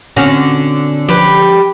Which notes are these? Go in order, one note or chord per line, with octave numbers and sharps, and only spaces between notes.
A#2 D3 C4 C#4 F#4
F3 G4 B4